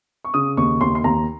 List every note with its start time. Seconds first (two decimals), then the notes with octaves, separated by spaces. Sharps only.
0.25 C#6
0.34 C#3 D#6
0.57 D#2 C#6
0.81 D#2 C6
0.95 C6
1.04 D#2 A#5